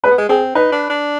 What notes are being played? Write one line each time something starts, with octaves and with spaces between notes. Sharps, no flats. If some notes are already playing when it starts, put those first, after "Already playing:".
G#3 B4
B3
G#3
C4 G#4
D#4 B4
D4
D4